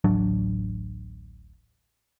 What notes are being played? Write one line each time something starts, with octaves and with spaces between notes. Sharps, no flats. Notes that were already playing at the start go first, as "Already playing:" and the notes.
D1 A1 F#3 D4